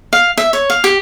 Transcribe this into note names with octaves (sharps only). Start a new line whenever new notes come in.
F5
E5
C#5
F5
G4